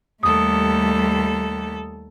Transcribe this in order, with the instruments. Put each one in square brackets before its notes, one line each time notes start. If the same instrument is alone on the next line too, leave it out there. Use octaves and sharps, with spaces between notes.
[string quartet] D#2 A4 [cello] G3 A3 [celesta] D#6